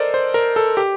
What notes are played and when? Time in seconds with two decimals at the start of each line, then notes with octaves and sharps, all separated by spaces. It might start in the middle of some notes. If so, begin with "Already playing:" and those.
Already playing: A4 A#4 C5 D5 D#5
0.14 C5
0.34 A#4
0.56 A4
0.77 G4